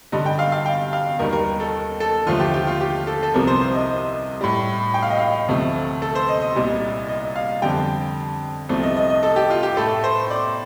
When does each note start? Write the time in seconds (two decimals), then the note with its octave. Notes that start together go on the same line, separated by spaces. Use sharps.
0.12 G2 D3 G3 D#5
0.26 G5
0.39 F5
0.52 F5
0.66 G5
0.93 F5
1.19 D#2 D#3 G3 A#4
1.33 A#4
1.60 A4
2.00 A4
2.27 D#2 D3 F3 A3 F4
2.40 G4
2.54 G4
2.67 F4
2.81 G4
3.07 A4
3.23 A4
3.34 C2 C3 F3 A#4
3.47 C5
3.61 C5
3.74 D#5
4.41 A2 G3
4.94 G5
5.03 F5
5.10 D#5
5.19 F5
5.49 D2 C3 F3 A3
6.02 A4
6.15 C5
6.29 D#5
6.42 D#5
6.55 C2 A#2 G3
7.08 D#5
7.36 F5
7.62 F2 D3 G3 G5
8.69 C2 C3 F3 A3
8.83 D#5
8.97 D#5
9.10 D#5
9.23 A4
9.36 G4
9.50 F4
9.63 G4
9.77 A2 A3 A4
10.04 C5
10.30 D5